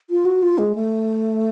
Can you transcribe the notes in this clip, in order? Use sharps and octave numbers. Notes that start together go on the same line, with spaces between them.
F4
F#4
F4
G#3
A3